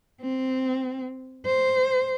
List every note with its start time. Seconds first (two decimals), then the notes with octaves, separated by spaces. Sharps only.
0.21 C4
1.46 C5